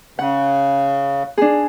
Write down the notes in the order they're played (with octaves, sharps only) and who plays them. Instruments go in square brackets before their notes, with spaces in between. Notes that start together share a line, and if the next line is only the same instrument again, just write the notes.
[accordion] C#3 [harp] F#5
[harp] D4 G#4